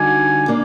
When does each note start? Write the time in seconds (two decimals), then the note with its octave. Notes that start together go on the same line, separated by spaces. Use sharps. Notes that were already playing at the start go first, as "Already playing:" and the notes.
Already playing: D3 G3 D#4 F#4 G#5
0.48 A#3 D4